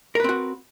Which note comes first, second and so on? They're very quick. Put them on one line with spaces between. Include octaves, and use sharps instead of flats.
A#4 B4 C4 F#4